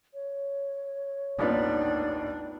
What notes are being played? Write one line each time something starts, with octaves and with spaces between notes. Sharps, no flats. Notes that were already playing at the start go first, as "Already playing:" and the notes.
C#5
A1 D#2 B3 D4 D#4 F4 B4